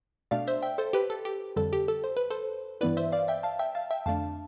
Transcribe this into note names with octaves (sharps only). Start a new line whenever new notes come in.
B2 A3 D4 D5 F5
C5 E5
E5 G5
A4 C5
G4 B4
A4
G4
F2 D3 G3 A4
G4
A4
C5
B4
A4 C5
G2 E3 B3 E4 B4 D5
C5 E5
D5 F5
E5 G5
F5 A5
E5 G5
F5 A5
E5 G5
F2 D3 A3 D4 F5 A5